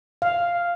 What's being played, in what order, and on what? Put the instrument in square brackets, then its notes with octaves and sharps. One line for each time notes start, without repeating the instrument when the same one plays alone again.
[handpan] F5